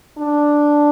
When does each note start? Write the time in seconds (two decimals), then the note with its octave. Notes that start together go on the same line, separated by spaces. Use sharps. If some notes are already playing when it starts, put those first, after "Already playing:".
0.18 D4